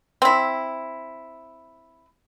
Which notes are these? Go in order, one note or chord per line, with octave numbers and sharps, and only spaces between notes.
C4 E4